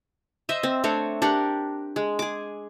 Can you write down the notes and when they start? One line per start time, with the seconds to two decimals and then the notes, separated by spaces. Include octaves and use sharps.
0.49 C5 D#5 E5
0.63 C4
0.84 A3 C4 D4 C#5
1.22 D4 G4 A#4 F#5
1.96 G#3
2.19 G#4 D6